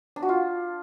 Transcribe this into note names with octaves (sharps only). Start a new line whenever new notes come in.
D4
F#4
F4